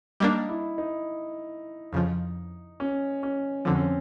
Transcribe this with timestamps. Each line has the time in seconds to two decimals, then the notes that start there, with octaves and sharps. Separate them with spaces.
0.20 G3 A#3 D4 D#4
0.49 E4
0.78 D#4
1.93 F2 C#3 F3
2.80 C#4
3.23 C#4
3.65 F2 D3 F3 C4
3.75 C#4